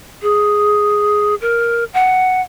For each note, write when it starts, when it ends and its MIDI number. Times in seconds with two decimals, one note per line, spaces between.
0.22 1.35 68
1.41 1.84 70
1.94 2.41 78